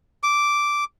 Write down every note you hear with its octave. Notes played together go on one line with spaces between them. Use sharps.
D6